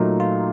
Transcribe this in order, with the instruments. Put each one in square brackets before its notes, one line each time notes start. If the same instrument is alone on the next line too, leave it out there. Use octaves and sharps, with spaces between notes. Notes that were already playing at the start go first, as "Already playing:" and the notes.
Already playing: [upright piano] A#2 F#3 A3 [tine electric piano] D#4
[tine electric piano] F4